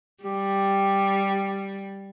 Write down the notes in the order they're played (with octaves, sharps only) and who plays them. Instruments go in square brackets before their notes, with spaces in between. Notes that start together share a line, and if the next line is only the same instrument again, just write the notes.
[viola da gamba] G3 [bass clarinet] G4